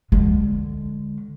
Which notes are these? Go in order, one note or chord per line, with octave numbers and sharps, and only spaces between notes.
D3 G#3